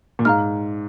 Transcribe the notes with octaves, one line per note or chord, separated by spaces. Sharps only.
A#2
G#2 F5 A#5 F6